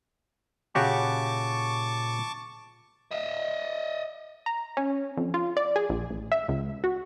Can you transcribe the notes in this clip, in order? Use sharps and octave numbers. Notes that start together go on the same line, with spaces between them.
A#2 C#3 F#4 G4 A5 C#6 D6
D#5 E5
A#5
C#4
F2
F4
D5
G#4
A#1
A1
E5
C#2
F#4